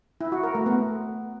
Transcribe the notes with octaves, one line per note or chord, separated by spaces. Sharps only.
E4
F#4
A#4
A3
B3